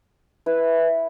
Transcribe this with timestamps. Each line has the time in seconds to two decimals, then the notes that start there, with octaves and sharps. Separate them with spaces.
0.46 E4 B4